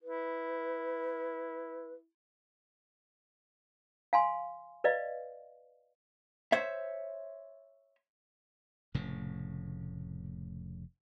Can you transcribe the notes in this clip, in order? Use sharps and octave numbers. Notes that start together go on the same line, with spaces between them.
E4 B4
F5 G#5 C6
B4 D5 D#5 F5
C5 C#5 E5
F1 A2 C#3